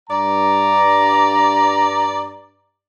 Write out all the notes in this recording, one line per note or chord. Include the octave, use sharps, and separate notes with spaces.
G2 D5 A#5